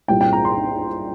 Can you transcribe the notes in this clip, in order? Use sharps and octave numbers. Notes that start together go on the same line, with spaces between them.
C2 A#2 G3 A#3 G5
G5
A#5
C6